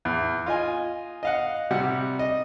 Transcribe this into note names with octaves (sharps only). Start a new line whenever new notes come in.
E2
F4 D#5 G#5
D#5 F5 F#5
C3 G3 F#5
D#5